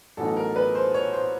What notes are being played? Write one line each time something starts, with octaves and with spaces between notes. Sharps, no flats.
A1 A2 F#3 B3 D#4 A4
A#4
B4
C5
C#5
C5